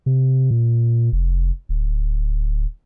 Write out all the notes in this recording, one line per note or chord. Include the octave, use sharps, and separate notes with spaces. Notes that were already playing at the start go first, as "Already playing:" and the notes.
C3
A#2
F1
D1